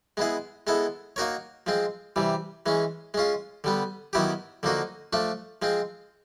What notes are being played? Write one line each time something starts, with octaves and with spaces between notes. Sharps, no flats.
G#3 B3 E4 G#4
G#3 B3 E4 A4
A#3 D#4 F#4 A#4 C#5
F3 G#3 C4
C3 E3 G3
E3 G#3 C#4
G#3 C#4 F4
D3 G3 B3
D#3 F#3 B3 E4 G4
D3 F3 A#3 D#4 F#4
F3 A3 D4
F3 G#3 C4